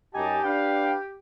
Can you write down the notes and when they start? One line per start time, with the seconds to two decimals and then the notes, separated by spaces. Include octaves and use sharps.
0.14 F#2 D#4 G4 G#5 A5
0.43 D4 B4 F5 G5